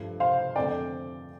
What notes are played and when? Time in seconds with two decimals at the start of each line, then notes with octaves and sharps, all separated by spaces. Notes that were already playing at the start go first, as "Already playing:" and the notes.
Already playing: G2 F3 A3
0.20 C5 F5
0.56 F2 D3 A3 C4 D5 G5